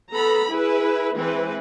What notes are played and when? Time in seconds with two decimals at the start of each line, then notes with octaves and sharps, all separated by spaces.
0.12 B3 A4 A#5 B5
0.49 E4 G#4 B4
1.15 E3 G#3 C4 B4